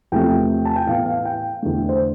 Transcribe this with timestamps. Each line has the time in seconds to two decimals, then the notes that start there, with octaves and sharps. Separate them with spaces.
0.12 E2 C3 F3 A3 G5
0.65 A5
0.76 G5
0.87 A2 E3 B3 F5
1.05 F5
1.25 G5
1.62 E2 D3 A3
1.89 C5